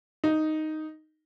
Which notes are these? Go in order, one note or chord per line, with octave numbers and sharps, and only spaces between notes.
D#4